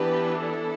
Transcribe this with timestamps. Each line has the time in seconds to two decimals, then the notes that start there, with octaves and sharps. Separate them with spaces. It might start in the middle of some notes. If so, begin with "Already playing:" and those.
Already playing: E3 B3 D4 G4 B4
0.39 E4 A4